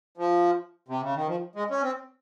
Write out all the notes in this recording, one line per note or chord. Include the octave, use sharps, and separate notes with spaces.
F3
C3
C#3
D#3
F3
G#3
C#4
C4